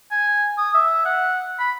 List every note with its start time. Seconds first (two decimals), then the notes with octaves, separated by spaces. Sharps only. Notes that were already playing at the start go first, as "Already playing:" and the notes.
0.11 G#5
0.58 D#6
0.74 E5
1.05 F#5
1.59 B5